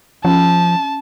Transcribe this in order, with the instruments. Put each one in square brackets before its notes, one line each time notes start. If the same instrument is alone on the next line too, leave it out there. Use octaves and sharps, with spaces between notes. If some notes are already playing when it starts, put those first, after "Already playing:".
[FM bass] F3 [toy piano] C#4 C6 [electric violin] A5